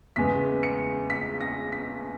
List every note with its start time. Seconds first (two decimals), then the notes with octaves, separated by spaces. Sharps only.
0.16 E2 C#3 G#3 B3 B6
0.63 C#7
1.10 B6
1.41 A#6
1.72 B6